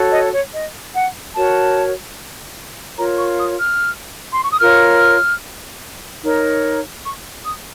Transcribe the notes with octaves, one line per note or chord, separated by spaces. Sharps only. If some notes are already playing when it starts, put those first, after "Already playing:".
Already playing: F#4 A4 C#5
D#5
C#5
D#5
F#5
F#4 A#4 C#5 A5
F4 A#4 C#5 A#5
C#6
D#6
F6
C6
C#6
D#6
F4 A#4 C#5 F6
D#4 A#4 C#5
C#6
D#6